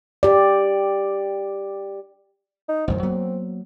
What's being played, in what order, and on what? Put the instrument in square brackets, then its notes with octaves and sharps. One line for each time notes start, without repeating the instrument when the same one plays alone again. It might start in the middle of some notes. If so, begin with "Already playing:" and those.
[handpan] G4 D5
[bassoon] D#4
[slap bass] A1 F#2 D#3 [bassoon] C4
[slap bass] F#3 A#3 B3